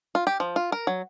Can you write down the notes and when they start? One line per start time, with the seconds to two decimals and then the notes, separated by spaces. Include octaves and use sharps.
0.15 F4
0.27 G4
0.40 F3
0.56 F4
0.72 A#4
0.87 F#3